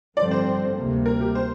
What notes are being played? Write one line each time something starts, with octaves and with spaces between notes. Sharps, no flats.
G2 D3 F3 C4 D5
C5
D2 C3 G3 A#3
A#4
G4
C5